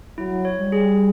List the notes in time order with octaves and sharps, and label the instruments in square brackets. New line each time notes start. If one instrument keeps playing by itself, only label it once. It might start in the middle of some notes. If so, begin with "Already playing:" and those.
[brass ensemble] F#3 [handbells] E4
[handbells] C#5
[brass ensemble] G3
[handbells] G#4